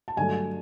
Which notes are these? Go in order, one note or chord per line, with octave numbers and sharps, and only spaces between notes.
A5
G2 D3 F#3 A3 G#5